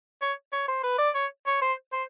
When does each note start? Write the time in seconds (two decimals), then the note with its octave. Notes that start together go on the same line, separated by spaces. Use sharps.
0.22 C#5
0.53 C#5
0.68 C5
0.83 B4
0.98 D5
1.15 C#5
1.46 C#5
1.62 C5
1.93 C5